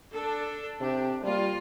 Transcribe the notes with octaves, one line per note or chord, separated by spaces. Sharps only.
D4 A4
C3 D4 G4
G3 A#3 F4